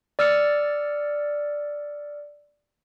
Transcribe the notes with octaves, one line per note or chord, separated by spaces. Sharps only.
D5 E6 F6 A6 C#7